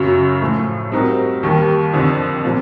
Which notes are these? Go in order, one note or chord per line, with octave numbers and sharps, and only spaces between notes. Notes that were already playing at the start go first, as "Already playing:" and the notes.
Already playing: F#2 C#3 F#3
A2 F3 A3
G3 C4 D#4 F#4 A#4
D#2 D#3 G3
F2 D3 F3
C3 F3 A#3